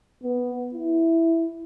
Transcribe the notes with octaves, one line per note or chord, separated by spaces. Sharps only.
B3
E4